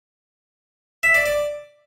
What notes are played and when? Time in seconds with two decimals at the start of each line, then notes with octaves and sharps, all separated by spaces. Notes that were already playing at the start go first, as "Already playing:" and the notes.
1.03 E5
1.14 D5
1.26 D5